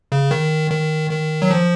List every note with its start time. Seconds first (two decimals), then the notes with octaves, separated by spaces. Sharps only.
0.12 C#3
0.31 D#3
0.71 D#3
1.11 D#3
1.42 F#3
1.51 F3